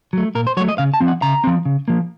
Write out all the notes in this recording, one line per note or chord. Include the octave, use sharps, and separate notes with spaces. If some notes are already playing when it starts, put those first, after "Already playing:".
F#3 A3
A#2 A#4
C5
F#3 A3 C#5
D#5
C#3 F5
A5
F3 C4
F#5
C#3 A#5
F3 C4
C#3
F3 A#3